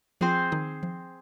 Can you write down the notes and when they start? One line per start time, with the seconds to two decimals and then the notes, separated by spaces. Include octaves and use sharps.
0.21 F3 C4 F4 G#4 C5
0.52 D#3 D#4
0.83 F3